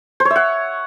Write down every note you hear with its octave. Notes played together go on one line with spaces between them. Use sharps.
C5
C#5
E5
F#5